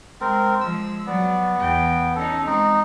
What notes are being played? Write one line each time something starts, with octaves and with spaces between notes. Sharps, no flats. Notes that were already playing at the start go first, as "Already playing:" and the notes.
G#3 C4 A#4
F3 G#3 E6
F#3 B3 D5
E2 G5
C#4 D#4 A4
G#3 C4 D#4